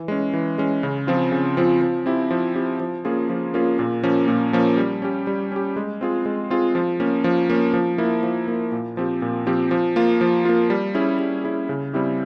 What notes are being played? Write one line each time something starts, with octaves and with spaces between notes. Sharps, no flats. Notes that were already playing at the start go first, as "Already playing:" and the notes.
Already playing: E3
G#3 C#4
E3
G#3 C#4
C#3
F3 C4 F4
C#3
F3 C4 F4
F3
C4 E4 G4
F3
C4 E4 G4
F3
A#3 C#4 F4 G#4
F3
A#3 C#4 F4 G#4
A#2
F3 A#3 C#4
A#2
F3 A#3 C#4
G3
C#4 G4
G3
C#4 G4
G#3
C4 F4 G#4
G#3
C4 F4 G#4
F3
A#3 C#4
F3
A#3 C#4
F3
A#3 E4
F3
A#3 E4
A#2
F3 C4 G4
A#2
F3 C4 G4
F3
A#3 F4
F3
A#3 F4
G3
C#4 E4 G#4
G3
C#4 E4 G#4
C#3
G3 C4 E4 G4